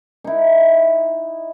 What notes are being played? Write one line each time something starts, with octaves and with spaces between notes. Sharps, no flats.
D#4 E4